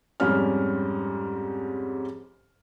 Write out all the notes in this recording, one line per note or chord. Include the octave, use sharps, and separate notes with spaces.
F2 G#2 G3 C#4 F6